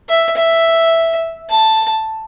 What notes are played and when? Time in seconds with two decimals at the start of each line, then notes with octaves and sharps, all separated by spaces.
0.09 E5
0.36 E5
1.49 A5